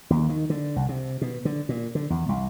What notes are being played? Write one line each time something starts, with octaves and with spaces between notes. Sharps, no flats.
D#2
D#3
D3
C2
C3
B2
D3
A#2
D3
E2
C2